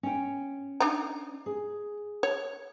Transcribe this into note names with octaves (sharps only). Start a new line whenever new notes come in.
C#4 G5
D4 D#4 A#5
G#4
C#5